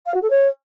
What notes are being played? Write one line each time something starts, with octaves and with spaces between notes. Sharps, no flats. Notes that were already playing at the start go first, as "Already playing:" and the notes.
F5
F#4
A4
C#5